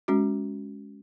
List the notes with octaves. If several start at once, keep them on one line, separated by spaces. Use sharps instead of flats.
G#3 C#4 F#4